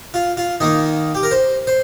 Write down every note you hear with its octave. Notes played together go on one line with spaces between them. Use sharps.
F4
F4
D#3 A#3 D#4
G4
A#4
C5
C5